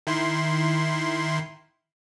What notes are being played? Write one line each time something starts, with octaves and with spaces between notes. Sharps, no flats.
D#3 E4 C6